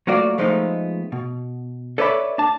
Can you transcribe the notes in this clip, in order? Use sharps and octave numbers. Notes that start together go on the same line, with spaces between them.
F#3 A3 A#3 F4 F#4 D5
F3 G#3 A3 B3 D#4
B2
A4 B4 C#5 D5 E5 B5
D4 A5